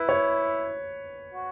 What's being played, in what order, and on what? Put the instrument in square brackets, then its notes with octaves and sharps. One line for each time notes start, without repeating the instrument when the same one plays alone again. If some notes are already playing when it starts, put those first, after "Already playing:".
Already playing: [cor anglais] E4 [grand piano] B4
[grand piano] C#5
[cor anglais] F#4